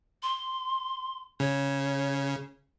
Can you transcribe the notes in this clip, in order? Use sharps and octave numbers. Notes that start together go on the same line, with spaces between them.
C6
C#3 C#5